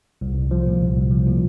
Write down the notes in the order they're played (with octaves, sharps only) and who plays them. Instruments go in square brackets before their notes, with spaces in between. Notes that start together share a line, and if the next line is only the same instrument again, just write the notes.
[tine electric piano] C2
C2
F3
A#2
C2
C2
F3
A#2